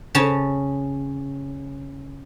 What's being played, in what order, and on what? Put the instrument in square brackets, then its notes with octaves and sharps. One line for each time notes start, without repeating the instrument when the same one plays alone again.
[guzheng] C#3 C#4 A5